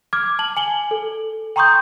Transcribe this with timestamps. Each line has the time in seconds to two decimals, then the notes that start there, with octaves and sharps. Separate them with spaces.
0.13 D6 F6 G#6
0.39 A5 F#7
0.57 G#5 F#7 G7
0.91 A4
1.56 G5 A#5 C6 C#6 D#6 G6